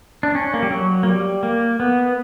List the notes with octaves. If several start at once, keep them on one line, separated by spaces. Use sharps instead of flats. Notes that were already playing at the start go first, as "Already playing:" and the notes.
D4
C#4
A#3
G3
F#3
A#3
G3
A#3
B3